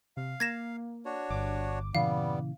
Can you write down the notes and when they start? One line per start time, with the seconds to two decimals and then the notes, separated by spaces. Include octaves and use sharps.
0.17 C3 F5
0.40 A#3 G#6 A#6 E7
1.05 D4 F#4 C#5
1.30 G1 G2 D6
1.95 A#2 C#3 E3 G3 B3 F5